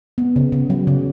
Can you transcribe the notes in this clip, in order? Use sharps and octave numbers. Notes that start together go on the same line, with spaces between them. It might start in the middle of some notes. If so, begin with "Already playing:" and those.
B3
C#3
C#3
F#3
C#3